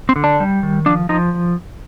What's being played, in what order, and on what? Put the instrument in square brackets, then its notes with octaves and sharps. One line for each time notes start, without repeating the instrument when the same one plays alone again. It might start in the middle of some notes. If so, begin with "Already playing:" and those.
[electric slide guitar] C4
D3
D4
G3
D#3
F3 D4
F3 D#4